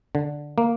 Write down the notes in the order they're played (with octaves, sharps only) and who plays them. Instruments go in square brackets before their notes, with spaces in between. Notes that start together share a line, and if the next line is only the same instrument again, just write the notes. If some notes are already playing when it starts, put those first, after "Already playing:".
[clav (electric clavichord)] D3
A#3